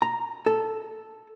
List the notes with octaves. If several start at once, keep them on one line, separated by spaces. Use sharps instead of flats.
A#5
A4